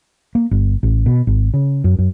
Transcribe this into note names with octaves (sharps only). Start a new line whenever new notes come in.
A#3
G1
A1
B2
G#1
C#3
F#2
F#2